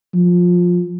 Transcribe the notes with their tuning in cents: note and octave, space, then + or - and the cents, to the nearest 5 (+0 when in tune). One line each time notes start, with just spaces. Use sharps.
F3 +15